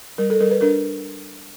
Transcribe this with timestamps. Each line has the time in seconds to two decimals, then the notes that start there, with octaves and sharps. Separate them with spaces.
0.18 G3 A#4
0.30 A4
0.40 G3 A#4
0.51 B4
0.61 D4 A#4